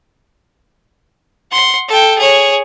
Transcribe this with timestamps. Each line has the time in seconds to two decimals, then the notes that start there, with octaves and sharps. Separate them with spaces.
1.51 F#5 C6
1.88 A4 G5
2.18 G#4 C#5